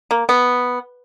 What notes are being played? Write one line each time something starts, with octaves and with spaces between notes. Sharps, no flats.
A#3
B3